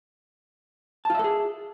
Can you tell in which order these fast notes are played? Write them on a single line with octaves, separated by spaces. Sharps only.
A5 F4 E5 A4 G#4